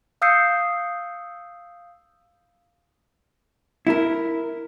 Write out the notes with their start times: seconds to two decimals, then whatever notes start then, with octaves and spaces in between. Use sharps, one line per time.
0.22 F5 D#6 E6 G6 C7 C#7
3.87 E4 A#4